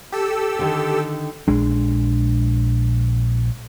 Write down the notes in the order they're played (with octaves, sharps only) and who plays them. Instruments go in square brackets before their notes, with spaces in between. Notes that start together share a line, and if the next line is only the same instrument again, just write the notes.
[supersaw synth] G4 A4 E6
[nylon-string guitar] D3 D#3
[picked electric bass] A#1 G#3 D4